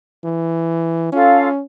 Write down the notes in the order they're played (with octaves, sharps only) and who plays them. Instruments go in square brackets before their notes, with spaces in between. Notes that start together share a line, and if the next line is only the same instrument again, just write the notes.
[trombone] E3
[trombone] C#4 [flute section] F4 A4 F5